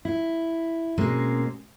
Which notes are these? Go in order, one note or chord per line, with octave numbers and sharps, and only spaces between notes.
E4
B2 G#3 A#3 C4 C#4